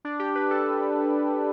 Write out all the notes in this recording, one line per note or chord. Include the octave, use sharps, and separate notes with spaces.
D4
G4
B4
A4